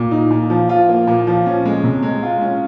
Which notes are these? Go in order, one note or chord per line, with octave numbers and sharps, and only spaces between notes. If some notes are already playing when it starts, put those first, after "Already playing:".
Already playing: A#2
D#4
A#2
F3
F4
A#3
A#2
F3
C#4
G#3
C3
G#3
F4
C#4